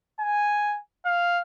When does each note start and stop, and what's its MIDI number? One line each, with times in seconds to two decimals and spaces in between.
0.20 0.77 80
1.05 1.41 77